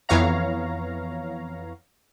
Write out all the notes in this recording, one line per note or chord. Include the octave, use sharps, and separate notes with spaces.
F2 E3 B3 C#5 F5 A#5